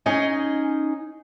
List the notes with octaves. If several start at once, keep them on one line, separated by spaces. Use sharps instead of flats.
C#4 D#4 G#4 D#5 G#5